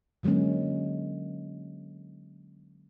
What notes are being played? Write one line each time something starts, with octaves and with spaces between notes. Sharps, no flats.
D3 F#3 G#3 A#3 C#4